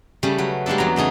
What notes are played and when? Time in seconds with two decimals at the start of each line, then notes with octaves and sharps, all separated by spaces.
0.23 C#3 G3 A3 C#4
0.38 F#3 B4
0.66 G3 G#3 A#3 D4 A4
0.78 E2 F#3 B3 A#5
0.96 C#3 A3 D#4 G#4